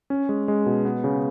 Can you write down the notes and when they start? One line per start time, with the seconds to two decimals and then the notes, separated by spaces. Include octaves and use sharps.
0.10 C#4
0.29 G#3
0.48 G#3
0.66 B2
0.85 B3
1.04 C#3